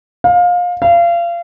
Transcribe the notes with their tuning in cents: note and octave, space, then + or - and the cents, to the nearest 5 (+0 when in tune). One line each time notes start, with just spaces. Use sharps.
F5 +25
F5 -30